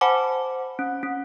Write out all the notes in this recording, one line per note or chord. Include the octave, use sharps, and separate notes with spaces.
C5 F#5 G#5 A5 B5 D6
C#4
C#4